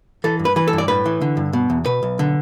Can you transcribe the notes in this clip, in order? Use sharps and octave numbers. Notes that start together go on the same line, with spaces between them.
E3 A4
G2
B4
E3 B4
A4
G2
D5
A2 B4
E3
D3
G2
B2
E2
B2 B4
B1
D3